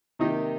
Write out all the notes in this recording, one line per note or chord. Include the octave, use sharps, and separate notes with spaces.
C3 D#3 A#3 D#4 G4